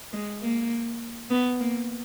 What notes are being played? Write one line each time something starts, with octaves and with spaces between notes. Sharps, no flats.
G#3
A#3
B3
A#3